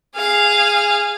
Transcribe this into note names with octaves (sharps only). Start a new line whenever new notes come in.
G#4 F5